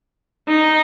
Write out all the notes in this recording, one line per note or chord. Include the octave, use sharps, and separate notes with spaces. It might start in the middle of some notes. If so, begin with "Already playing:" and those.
D#4